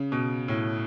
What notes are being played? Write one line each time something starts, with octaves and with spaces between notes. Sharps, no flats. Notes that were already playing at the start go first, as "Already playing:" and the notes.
Already playing: C#3
B2
A2